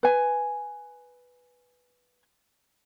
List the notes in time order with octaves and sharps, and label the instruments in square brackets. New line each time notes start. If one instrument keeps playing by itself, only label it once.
[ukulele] B4 G#5